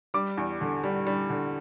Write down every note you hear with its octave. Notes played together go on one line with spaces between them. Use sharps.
G3 D6
E2
D3
G3
G3
D3